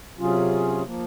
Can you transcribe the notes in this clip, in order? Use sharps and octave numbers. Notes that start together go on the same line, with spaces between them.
C3 F#3 C#4 F4 G#4
F3 A#3